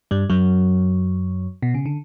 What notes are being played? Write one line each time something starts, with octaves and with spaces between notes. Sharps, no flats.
G2 G3
F#2 F#3
B2
C#3
D3